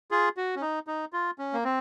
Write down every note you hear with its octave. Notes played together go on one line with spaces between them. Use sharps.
F4 G#4
F#4
C#4
D#4
D#4
F4
C#4
A#3
C4